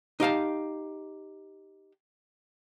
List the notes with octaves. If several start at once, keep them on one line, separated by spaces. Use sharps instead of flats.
D#4 G4 F5 A5